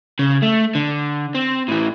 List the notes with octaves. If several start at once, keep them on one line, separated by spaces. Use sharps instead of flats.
C#3
A3
D3
C4
A2 E3